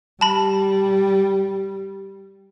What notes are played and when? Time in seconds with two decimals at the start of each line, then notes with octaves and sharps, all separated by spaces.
0.21 G3 A5 B5